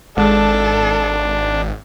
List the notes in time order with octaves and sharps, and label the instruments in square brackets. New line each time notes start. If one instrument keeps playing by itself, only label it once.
[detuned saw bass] G#1 [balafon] G#3 G#4 [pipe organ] D4 [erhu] A4